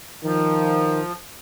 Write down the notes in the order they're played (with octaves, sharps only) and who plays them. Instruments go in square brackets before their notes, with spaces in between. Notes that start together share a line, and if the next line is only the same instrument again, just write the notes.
[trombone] D#3 [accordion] F3